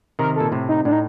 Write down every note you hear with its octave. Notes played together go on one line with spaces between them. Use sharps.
C3 D#3 A#4
A#2 A4
A2 C3
D#4
A2 D4
D#4